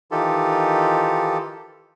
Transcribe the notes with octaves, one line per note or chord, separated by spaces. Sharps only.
D#3 E3 D#4 F4 G4 A4